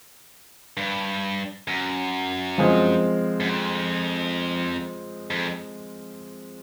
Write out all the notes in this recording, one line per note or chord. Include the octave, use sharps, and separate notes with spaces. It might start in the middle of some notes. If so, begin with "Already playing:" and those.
G2
F#2
F3 G#3 C4
F#2
F2
F2